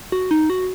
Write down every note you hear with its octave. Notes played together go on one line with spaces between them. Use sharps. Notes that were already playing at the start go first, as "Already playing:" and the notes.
F#4
D#4
F#4